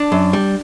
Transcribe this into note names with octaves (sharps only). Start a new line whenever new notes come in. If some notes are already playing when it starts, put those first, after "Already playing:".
Already playing: D4
F#2
G3